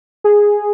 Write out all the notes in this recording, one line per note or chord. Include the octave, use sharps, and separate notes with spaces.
G#4